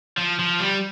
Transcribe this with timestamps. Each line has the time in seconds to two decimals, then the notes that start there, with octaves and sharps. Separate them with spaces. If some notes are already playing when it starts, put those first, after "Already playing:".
0.18 F3
0.40 F3
0.60 G3